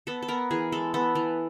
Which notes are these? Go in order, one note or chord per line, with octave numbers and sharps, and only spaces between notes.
B3 A4
A4
B3 A#4
E3 G#4
G#3 A4
B3 A4
E3